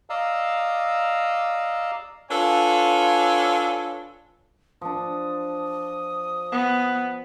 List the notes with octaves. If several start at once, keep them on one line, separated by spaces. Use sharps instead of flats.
D5 D#5 F5 A#5 E6
D4 F4 A4 B4 C#5 G#5
F3 D4 D#6
B3